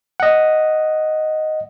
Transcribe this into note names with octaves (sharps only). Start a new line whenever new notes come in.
D#5 F#5